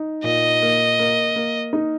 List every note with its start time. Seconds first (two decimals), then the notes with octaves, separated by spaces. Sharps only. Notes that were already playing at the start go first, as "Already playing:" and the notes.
Already playing: D#4
0.24 A#2 D#5
0.62 A#3
0.99 A#3
1.36 A#3
1.73 D#4